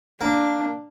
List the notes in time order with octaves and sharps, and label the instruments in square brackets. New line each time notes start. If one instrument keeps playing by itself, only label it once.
[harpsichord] A#3 [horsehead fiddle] D4